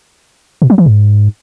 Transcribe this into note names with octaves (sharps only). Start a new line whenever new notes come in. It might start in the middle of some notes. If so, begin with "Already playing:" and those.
B2
F#3
E3
G#2